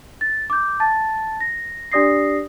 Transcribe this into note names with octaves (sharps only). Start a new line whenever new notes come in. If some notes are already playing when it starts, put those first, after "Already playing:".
A6
D6 G6
A5 A6
A#6
D4 G4 D5 D#6 A#6 C7